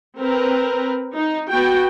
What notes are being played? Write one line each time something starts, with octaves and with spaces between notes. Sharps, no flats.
C4 A#4 B4
D#4
B3 F#4 G5